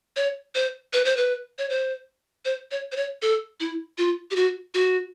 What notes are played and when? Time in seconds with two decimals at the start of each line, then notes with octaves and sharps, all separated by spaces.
0.16 C#5
0.55 C5
0.93 B4
1.05 C5
1.17 B4
1.58 C#5
1.70 C5
2.45 C5
2.71 C#5
2.92 C5
2.96 C#5
3.22 A4
3.60 E4
3.98 F4
4.31 G4
4.36 F#4
4.74 F#4